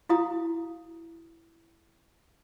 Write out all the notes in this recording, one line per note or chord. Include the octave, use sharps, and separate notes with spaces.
E4 F#4 F5 A#5 D#6